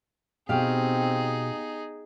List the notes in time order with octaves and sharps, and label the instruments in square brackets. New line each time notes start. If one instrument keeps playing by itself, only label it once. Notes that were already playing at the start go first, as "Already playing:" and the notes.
[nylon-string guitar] B2 [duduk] C4 [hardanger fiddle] D#4 G#4 [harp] G4 F5